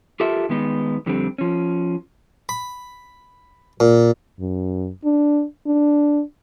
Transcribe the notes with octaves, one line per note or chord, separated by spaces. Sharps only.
F4 G4 A4 A#4 E5
D#3 G#3 B3 D#4
F2 D3 G3 C4
F3 C#4
B5
A#2
F#2
D4
D4